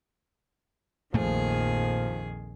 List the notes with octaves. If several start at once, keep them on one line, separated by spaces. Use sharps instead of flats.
A#1 F2 A#2 D#3 F3 A3 G#4